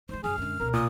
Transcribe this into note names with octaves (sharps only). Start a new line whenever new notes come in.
D#3 G#3 C5
F#2 C#3 G#4 F6
F#2 D3 G#3
C#2 B2 A#4
A#2 D#6